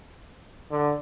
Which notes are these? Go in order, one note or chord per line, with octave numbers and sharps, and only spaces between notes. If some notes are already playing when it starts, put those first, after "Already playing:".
D3